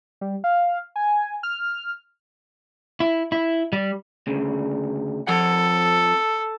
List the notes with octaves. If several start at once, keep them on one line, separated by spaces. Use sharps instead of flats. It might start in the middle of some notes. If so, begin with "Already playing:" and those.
G3
F5
G#5
F6
E4
E4
G3
D2 C#3
F2 F3 A4 F#5